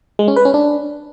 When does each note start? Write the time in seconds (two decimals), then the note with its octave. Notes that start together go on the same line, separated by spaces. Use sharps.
0.19 G#3
0.28 C#4
0.36 B4
0.45 C#4
0.54 D4